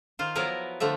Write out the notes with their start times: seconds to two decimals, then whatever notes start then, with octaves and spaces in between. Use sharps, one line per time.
0.19 D#3 F4 C5
0.35 F3 F#3 B3 E4 A#4 B4
0.80 D3 F3 A3 E5